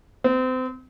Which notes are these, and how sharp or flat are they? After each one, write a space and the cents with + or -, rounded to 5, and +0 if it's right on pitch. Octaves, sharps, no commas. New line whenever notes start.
C4 -30